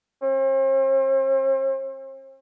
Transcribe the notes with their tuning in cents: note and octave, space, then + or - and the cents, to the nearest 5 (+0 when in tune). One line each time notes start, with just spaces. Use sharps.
C4 +45